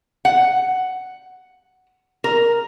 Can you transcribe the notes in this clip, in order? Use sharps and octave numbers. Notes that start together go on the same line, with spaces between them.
F#5
A#4